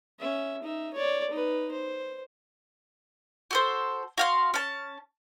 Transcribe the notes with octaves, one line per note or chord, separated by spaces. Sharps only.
C#4 E5
D#4 E5
C#5 D5
D#4 B4
C5
F#4 A4 C5
F#4 F5 C6
C#4 A5